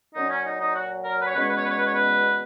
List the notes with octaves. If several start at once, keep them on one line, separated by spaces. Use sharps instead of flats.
A#2 F#3 C#4 D#4
C#4
D#4
D#4
F#4
A#4
B4
C#5
E2 B2 G#3 C#4 B4
C#5
B4
C#5
B4
C#5
B4
C#5
B4